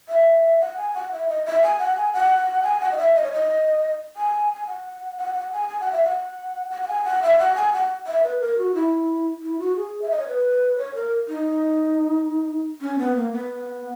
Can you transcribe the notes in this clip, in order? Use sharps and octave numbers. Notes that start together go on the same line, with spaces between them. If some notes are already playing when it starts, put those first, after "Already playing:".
E5
F#5
G#5
F#5
E5
D#5
E5
G#5
F#5
G#5
F#5
G#5
F#5
D#5
E5
D#5
C#5
D#5
G#5
G#5
F#5
F#5
F#5
G#5
G#5
F#5
E5
F#5
F#5
F#5
G#5
F#5
E5
F#5
G#5
F#5
E5
B4
A#4
F#4
E4
E4
F#4
G#4
E5
D#5
C#5
B4
C#5
A#4
D#4
C#4
B3
A#3
B3